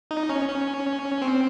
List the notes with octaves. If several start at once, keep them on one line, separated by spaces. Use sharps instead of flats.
D#4
C#4
C#4
C4